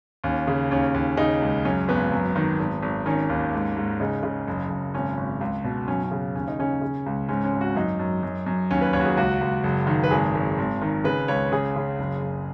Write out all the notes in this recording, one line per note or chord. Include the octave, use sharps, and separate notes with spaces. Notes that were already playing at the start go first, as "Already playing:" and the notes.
D#2 C#4
C#3
D#2 C#4
D#2
C#3 D#4
C#2
F#2 C#4
G#1 B3
F#2
D#3
G#1
G#1
D#3 C#4
D#2
G#2
G#2
C#3 D#4
C#3
F#1
F#1
G#1 C#4
G#1
C#2
B2
F#2 C#4
C#4
C#3
D#2 C#4
D#4
C#3 C#4
C#3
C#2
G#2 C#4
C#4
G#1
F#4
F#2 D#4
F#2
F#2
F#2
D#2 C#4
B4
D#2 C#5
F#4
G#4
C#2 F#4
C#2
F#1
D#3
B4
G#1 G#4
G#1
G#1
D#3
C#3 B4
C#2 C#5
C#3 G#4
C#3
F#1
F#1